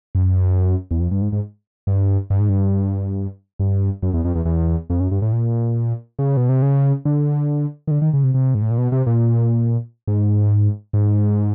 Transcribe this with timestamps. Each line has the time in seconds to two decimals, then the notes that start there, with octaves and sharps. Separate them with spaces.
0.15 F#2
0.91 E2
1.00 F2
1.11 G2
1.22 G#2
1.32 G#2
1.87 G2
2.30 G2
2.40 G#2
2.49 G2
3.59 G2
4.02 F#2
4.13 E2
4.25 F2
4.35 E2
4.45 E2
4.90 F2
5.00 F#2
5.11 G2
5.22 A2
5.32 A#2
6.19 C#3
6.37 B2
6.49 C3
6.62 C#3
7.05 D3
7.87 D#3
7.91 D3
8.02 D#3
8.14 C#3
8.24 C3
8.34 C3
8.55 G#2
8.62 A2
8.70 A#2
8.78 B2
8.92 C3
9.07 A#2
10.08 G#2
10.93 G#2